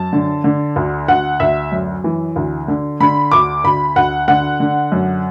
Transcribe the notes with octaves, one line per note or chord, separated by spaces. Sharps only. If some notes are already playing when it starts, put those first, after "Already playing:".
Already playing: F#2 A5
D3
D3
D2
D2 F#5
D2 E5
F#2
E3
D2
D3
D3 B5
D2 D6
D2 B5
D2 F#5
D3 F#5
D3
F#2